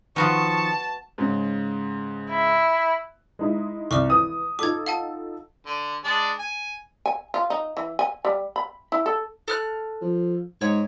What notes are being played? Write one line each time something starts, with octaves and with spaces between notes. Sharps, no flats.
D#3 F3 B3 F#4 F5 A5 C#6
G#2 C#3
E4
G#3 D#4 E4
C2 C#6 D6 F6
E3 D#6
D#4 F4 A4 D6 G#6
F5 F#5 A5
D3
G#3 D4 D5
G#5
G#5
F4
D#4
E3
G#5
G3
B5
E4
A4
A4 F6 F#6
F3
G#2 C#5